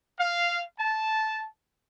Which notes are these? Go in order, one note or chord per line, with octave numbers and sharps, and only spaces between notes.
F5
A5